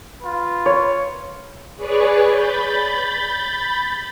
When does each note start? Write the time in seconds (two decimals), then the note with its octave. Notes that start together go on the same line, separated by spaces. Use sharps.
0.22 F4 B4
0.66 C#5
1.76 G#4 B4 C#5 D5 C#6
2.24 B5 G6 A6